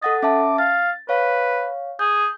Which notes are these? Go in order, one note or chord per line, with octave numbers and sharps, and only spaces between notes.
A4 D#5 F#5 A6
C#4 E5 A5 D6
F5 A6
B4 C#5 F5
G#4 G6